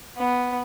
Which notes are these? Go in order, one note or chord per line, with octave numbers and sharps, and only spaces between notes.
B3